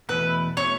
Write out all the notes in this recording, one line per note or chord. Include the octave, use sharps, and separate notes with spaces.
E2 B2 A3 E4 B4
B2 A3 E4 C#5